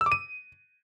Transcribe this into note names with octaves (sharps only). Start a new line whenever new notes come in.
E6
D6
D#7